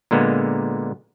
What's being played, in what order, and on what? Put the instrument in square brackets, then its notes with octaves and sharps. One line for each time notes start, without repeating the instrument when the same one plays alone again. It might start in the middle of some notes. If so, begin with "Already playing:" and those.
[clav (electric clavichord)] A#2 D3 G#3 A#3 B3